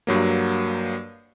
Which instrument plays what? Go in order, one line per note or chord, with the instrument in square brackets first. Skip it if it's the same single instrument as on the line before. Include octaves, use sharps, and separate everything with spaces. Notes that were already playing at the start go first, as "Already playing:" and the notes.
[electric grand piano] G2 F#3 A#3